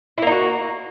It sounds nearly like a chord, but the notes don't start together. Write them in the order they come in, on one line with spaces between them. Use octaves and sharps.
E4 A#3 D#4 F#4